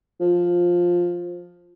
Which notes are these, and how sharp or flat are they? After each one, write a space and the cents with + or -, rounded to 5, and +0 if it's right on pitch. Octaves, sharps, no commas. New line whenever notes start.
F3 +10